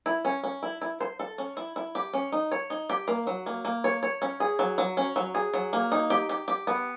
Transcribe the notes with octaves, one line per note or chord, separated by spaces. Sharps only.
E4
C#4
C#4
E4
E4
C5
A4
C#4
E4
E4
G4
C#4
D#4
C#5
D#4
G4
A#3
F#3
A#3
A#3
C#5
C#5
C#4
G#4
F#3
F#3
C#4
F#3
G#4
F#3
A#3
D#4
G4
G4
G4
B3